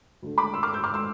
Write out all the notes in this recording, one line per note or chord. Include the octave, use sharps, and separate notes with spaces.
D2 D3 A3
B5 D6
C6 E6
D6 F6
E6 G6
D6 F6
C6 E6